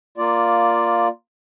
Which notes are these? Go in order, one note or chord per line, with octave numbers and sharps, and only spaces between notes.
A#3 F4 D5